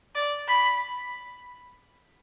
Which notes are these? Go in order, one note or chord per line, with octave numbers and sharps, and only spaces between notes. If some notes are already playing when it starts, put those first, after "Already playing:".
D5
B5